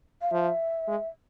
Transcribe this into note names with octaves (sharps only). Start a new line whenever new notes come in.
F5
F3 E5
G#3